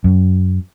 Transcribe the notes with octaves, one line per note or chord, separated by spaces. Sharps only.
F#2